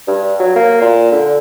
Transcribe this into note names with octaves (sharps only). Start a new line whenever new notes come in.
G2
F#3
A#3
A#2
D3